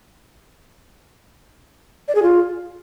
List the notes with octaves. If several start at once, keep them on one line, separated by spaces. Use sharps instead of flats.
D5
G#4
F4